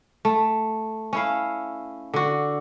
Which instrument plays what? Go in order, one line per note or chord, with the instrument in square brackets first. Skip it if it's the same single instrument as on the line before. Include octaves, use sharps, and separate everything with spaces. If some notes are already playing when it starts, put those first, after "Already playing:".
[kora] A3
C#4 E4 F5
D3 F#4